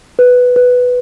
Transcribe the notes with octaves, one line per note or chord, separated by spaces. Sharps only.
B4
B4